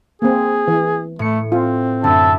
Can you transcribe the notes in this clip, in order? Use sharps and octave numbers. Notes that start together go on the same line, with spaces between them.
A#3 C4 G#4
E3
A2 A3 C#7
C4 F4
F#2 D3 E5 A5